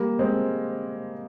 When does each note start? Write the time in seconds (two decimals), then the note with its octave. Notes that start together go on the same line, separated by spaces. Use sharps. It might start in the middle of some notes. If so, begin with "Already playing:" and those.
Already playing: G3 A#3
0.19 G#3 C4